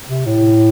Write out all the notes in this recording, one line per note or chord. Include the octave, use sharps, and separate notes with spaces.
C3
A2